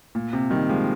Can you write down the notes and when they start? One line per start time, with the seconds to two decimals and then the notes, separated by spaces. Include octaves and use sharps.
0.15 A#2
0.33 C3
0.50 D#3 G3
0.69 F3 G#3